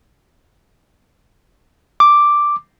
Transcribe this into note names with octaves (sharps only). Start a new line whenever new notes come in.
D6